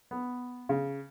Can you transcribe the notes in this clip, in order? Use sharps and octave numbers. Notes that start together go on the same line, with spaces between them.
B3
C#3